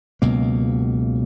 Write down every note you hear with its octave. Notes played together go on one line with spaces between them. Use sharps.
C#2 B2 F#3 A#3